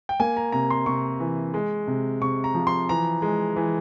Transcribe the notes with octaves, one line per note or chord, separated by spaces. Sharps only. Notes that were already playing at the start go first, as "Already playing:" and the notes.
G5
A#3 G#5
A#5
C3 A#5
C6
C3 C#6
E3
G#3
C3
C3 C#6
A#5
F3
C6
E3 A#5
G#3
E3